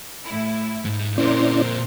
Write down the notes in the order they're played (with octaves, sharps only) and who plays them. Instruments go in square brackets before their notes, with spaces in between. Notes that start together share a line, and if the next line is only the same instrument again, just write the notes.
[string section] A2 E4
[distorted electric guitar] G#2
[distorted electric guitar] A#2 C4 [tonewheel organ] C#4 E4 D5 [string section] A#4 C5 C6